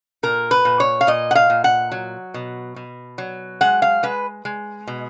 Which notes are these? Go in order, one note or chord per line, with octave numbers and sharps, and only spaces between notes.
A#2 A#4
B4
A#2
C#5
F5
A#2 D#5
F#5
F5
A#2
F#5
F#3
B2
B2
F#3
G#3 F#5
F5
G#3 B4
G#3
B2